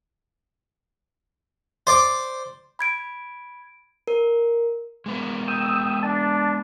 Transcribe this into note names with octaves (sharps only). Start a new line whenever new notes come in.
C5 D5 D6
B5 G#6 D7
A#4
G#3 B3 A#4
G5 D#6 E6
D4 A5